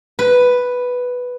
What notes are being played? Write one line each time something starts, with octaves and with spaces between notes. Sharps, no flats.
B4